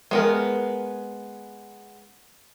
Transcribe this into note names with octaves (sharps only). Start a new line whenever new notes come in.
G#3 B3 A#4